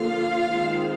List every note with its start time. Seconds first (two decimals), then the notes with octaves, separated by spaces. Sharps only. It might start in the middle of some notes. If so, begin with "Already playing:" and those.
Already playing: D3 F3 A#3 F4 F5
0.48 D#3 G#3 C4